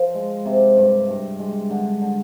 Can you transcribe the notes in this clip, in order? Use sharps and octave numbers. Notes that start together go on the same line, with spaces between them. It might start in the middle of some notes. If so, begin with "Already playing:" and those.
Already playing: F3
G#3
C3
G2
G2
G#3
D3
D3